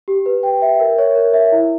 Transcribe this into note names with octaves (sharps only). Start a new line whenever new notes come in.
G4
B4
G5
E5
A#4
C#5
A#4
E5
E4